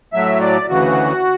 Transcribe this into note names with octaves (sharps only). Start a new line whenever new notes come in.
A2 F#3 E5
D5
D2 C#3 E3 F#4